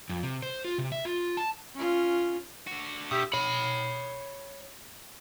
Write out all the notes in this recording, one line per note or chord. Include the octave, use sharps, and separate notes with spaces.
F2
C3
C5
F4
C3
E5
F4
A5
C#4 F4
D3 F#4
B2 G4 E5
C#5 B5